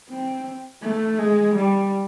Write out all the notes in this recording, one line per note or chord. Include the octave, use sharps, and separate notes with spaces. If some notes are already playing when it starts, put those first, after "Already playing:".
C4
A3
G#3
G3